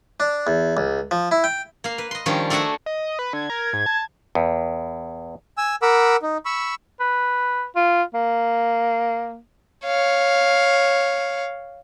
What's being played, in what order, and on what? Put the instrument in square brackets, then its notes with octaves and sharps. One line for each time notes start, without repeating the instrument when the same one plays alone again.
[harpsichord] D4
E2
C#2
F3
E4
G5
[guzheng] A#3 F5
B4
D#5 C6
D#3 F3 G3 C#4 D4
A3 D4 F#4 E5 F#5 G#5
[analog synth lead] D#5
B4
[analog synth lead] D3 [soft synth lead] G#6
[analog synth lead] A#4
G#2
A5
[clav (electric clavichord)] E2
[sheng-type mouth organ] G#5 E6
A#4 F#5 B5 D6 E6
D#4
B5 C#6 E6
[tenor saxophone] B4
F4
A#3
[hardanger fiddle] C#5 F5